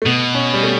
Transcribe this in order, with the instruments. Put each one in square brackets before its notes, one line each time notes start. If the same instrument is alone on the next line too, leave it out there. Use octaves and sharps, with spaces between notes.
[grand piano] A3
[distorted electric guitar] B2 [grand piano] B3
[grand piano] C#4
G3
A3